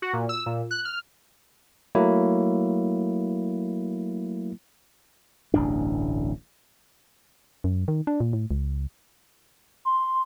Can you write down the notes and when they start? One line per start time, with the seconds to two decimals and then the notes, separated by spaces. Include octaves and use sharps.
0.02 F#4
0.13 A#2
0.29 E6
0.46 A#2
0.71 F#6
0.85 F6
1.95 F#3 A3 A#3 E4
5.54 D1 A1 G2 D4
7.64 F#2
7.88 D#3
8.07 D4
8.20 A#2
8.33 A2
8.51 C#2
9.85 C6